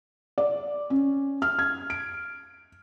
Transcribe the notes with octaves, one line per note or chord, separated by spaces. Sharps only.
D5
C#4
F6
G#6
D7